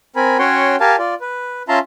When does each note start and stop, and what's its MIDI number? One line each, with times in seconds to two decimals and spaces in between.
0.16 0.37 60
0.16 0.37 70
0.16 0.37 80
0.16 0.37 83
0.39 0.76 61
0.39 0.76 66
0.39 0.76 73
0.39 0.76 78
0.39 0.76 79
0.39 0.76 84
0.80 0.96 67
0.80 0.96 70
0.80 0.96 77
0.80 0.96 80
0.80 0.96 81
0.99 1.15 65
0.99 1.15 74
1.21 1.63 71
1.69 1.79 61
1.69 1.79 65
1.69 1.79 76
1.69 1.79 81
1.69 1.79 82
1.69 1.79 84